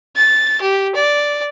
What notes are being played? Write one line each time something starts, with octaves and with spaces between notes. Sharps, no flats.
A6
G4
D5